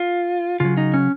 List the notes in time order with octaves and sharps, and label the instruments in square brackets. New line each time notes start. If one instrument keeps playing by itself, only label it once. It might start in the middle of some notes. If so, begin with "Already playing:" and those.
Already playing: [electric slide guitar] F4
C#3 F#3 F4
D#4
C#4